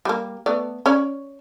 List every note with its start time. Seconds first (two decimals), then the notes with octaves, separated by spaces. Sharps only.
0.05 G3 A#3
0.46 A3 B3 D5
0.86 C#4 C#5 D5